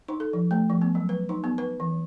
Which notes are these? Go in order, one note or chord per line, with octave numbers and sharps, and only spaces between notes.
D#4
A4
F3
A3
F3
B3
F#3
B4
D#4
B3
B4
E3